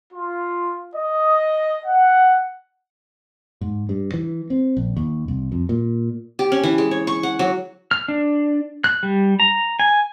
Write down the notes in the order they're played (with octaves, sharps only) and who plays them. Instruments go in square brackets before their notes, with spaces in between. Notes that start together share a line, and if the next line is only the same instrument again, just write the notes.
[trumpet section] F4
D#5
F#5
[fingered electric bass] G#2
G2
E3
C4
A#1
D#2
C2
F2
A#2
[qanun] G4
C#4
E3
G#3
C#5
C#6
F#5
F#3
[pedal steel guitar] F6
D4
F#6
G3
A#5
G#5